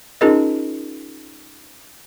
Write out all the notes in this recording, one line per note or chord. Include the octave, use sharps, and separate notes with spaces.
C#4 D#4 F4 G#4 A#4 D#5